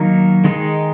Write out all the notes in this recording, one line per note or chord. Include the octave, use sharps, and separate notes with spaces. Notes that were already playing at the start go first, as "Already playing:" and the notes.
Already playing: D#3 F#3 A#3 D#4 A#4
D#3 G#3 D#4 G#4